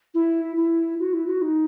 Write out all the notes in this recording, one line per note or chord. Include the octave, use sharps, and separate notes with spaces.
E4
E4
F#4
E4
F#4
D#4